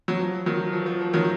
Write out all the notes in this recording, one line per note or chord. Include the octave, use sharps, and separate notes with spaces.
F#3
F3
D#3 F#3
F3
F3
F3
D#3 F#3